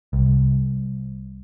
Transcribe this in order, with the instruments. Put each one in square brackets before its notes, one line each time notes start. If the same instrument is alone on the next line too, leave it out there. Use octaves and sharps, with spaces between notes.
[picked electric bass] C2